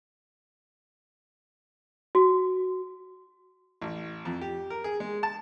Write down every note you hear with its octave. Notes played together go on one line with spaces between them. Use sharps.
F#4
A1
F2
G4
A#4
G#4
G#3
A5